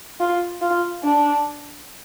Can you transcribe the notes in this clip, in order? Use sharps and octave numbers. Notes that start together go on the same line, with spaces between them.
F4
F4
D4